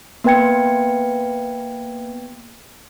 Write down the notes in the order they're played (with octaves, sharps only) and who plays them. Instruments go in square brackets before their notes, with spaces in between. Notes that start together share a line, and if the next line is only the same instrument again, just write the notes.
[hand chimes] A#3 B3 B4 G5 G#6 C#7